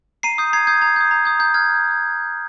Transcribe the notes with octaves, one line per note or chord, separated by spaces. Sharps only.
A#5 C7 D#7
D#6 G6
A#5 G#6 C7
D#6 G6 G#6
A#5 G#6
D#6 G6
A#5
D#6 G6
A#5 G6
F6 G#6